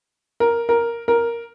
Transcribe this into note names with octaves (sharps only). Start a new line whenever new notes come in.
A#4
A#4
A#4